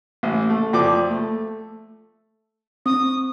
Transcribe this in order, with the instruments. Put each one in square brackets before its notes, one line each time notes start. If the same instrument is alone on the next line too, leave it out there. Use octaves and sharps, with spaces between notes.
[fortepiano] A1
A3
F2 F3 D5 D6
A3
[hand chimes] C4 [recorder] D#6